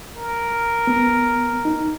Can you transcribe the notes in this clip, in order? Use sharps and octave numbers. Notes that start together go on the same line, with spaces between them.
A#4
B3
D#4